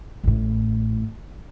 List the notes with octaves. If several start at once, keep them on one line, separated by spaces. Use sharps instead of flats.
A1 A2